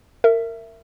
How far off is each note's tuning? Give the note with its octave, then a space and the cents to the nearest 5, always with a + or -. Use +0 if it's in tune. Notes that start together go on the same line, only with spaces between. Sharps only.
A#4 -20 E5 +10